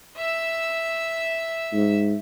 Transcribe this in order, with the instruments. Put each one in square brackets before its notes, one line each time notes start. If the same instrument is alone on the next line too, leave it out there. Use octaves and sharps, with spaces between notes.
[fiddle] E5 E6
[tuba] G#2